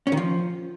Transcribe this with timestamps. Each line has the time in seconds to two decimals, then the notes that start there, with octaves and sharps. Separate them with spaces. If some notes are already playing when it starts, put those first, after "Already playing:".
0.07 C#4
0.12 D#3
0.17 F3